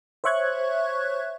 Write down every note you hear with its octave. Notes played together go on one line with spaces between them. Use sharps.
C5 C#5 E5 C#6 F#6 G#6